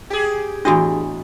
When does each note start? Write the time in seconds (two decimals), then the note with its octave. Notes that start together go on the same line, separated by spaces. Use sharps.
0.10 G4 G#4
0.65 E2 A2 D4 F#4 D#5